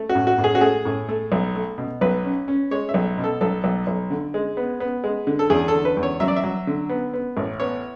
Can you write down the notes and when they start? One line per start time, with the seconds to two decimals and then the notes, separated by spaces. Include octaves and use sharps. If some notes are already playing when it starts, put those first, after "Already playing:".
Already playing: A3
0.09 F#4
0.15 A2
0.27 F#4
0.38 A2
0.44 G#4
0.55 F#4
0.61 A3 G#4
0.85 A2
1.09 A3
1.32 B1
1.55 A3
1.78 B2
2.01 B1 B4
2.24 C#4
2.48 C#4
2.71 G#3 C#5
2.89 E5
2.94 B1
3.18 B2
3.24 A4
3.41 B1 A4
3.64 B1
3.87 B1
4.10 D3
4.34 G#3
4.57 B3
4.80 B3
5.04 G#3
5.27 D3
5.39 A4
5.50 E2 G#4
5.68 A4
5.73 D3
5.85 B4
5.97 E2
6.03 C#5
6.20 F#3 E5
6.28 D5
6.36 E5
6.44 F#3
6.67 D3
6.89 B3
7.14 B3
7.37 A1
7.60 B3 C#5